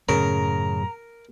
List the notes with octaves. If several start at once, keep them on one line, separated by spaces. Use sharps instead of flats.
F#2 A2 C#3 F#3 A#4 A#5